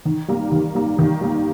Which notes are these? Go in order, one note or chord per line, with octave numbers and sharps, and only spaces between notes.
D#3
G3 A#3
D#3
G3 A#3
D#3
G3 A#3